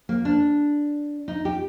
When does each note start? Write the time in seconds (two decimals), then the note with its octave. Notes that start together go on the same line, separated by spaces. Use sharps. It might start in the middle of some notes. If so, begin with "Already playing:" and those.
0.09 A#3
0.25 D4
1.28 D#4
1.45 G4